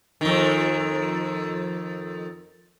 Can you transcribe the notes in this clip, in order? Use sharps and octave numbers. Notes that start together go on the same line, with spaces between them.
F2 D#3